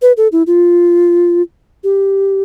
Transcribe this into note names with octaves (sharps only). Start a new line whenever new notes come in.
B4
A4
E4
F4
G4